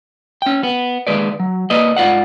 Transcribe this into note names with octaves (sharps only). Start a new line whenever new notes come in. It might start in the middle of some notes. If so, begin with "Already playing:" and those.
C#4 G5
B3
D#2 G#3 B4 D5
F#3
A#3 B4 D5 D#5
G#2 F4 D5 F#5